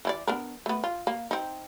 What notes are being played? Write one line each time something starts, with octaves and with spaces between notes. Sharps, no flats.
E3 E4 D5
B3 D4 A#4
A3 B3
F4
A#3
C4 D#4